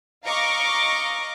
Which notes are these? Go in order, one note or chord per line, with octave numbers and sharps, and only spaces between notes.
D#5 F5 A#5 C#6 D6